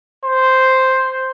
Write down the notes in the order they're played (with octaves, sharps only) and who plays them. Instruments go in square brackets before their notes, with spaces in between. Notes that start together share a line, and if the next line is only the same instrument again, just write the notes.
[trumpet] C5